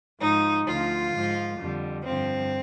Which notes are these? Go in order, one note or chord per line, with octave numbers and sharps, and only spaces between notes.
G#2 F3 D#4
D2 D3 F3 F4
G#2 F3
F2 D3 G3
G2 D3 F3 C4